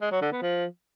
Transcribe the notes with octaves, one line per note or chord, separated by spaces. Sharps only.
G#3
F#3
D3
B3
F3